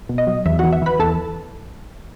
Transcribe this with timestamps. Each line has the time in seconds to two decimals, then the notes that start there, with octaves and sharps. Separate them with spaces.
0.09 B2
0.18 D#5
0.27 F#3
0.46 E2 E5
0.59 E3 F#4 F#5
0.72 E5
0.82 E3 B4 B5
0.99 E2 A4 A5